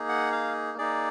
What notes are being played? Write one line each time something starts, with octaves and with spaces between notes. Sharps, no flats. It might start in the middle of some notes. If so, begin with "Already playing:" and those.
Already playing: A#3 D#4 G#4
F#5
F5
A#3 D#4 G#4 D5